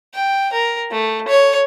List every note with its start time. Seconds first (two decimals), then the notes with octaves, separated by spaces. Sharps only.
0.14 G5
0.52 A#4
0.91 A3
1.28 C#5